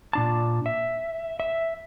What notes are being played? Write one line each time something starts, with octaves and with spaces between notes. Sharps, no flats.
A#2 D4 A5
E5
E5